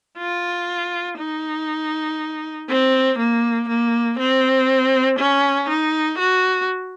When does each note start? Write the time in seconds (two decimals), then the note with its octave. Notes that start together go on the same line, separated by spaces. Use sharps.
0.18 F4
1.18 D#4
2.69 C4
3.18 A#3
3.68 A#3
4.18 C4
5.19 C#4
5.69 D#4
6.19 F#4